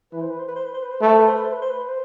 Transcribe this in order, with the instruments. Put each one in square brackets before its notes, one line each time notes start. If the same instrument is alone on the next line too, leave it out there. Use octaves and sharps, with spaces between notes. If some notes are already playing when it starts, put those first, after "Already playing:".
[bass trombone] E3 [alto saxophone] B4
[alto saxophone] C5
B4
C5
B4
C5
B4
C5
B4
C5
[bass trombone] A3 [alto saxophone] B4
[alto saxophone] C5
B4
C5
B4
C5
B4
C5
B4
C5